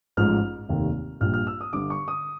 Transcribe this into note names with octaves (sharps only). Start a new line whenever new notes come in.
A1 G#2 F3 G#3 F6
F1 D#2 D#3
A#1 A#2 G3 F6
F6
E6
D#6
G1 G2 D3 D6
C#6
D#6